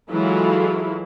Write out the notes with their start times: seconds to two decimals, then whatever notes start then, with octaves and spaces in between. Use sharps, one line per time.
0.11 E3 F#3 G#3 E4 F4 A4